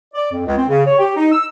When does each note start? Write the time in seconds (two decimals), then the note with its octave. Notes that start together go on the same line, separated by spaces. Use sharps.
0.14 D5
0.31 F2
0.46 C#2
0.57 C4
0.68 C#3
0.85 C#5
0.98 G4
1.16 D#4
1.32 E6